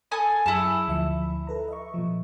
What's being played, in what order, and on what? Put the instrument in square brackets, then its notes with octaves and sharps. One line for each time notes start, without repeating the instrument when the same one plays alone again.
[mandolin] A4 G#5 D#6
[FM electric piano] F#2 G#4 C#7 [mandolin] E4 A5
[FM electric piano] D2 F3 E5
A4 B4 A#5
D#5 E5 C#6
A#2 F3